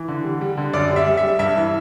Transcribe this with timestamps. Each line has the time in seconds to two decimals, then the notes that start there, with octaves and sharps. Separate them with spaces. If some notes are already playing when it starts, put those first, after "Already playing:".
Already playing: E3
0.08 D3
0.24 G3
0.41 G3
0.57 D3
0.73 F#2 D5
0.90 G3
0.96 E5
1.06 G3
1.17 E5
1.23 G3
1.39 G2 E5
1.56 E3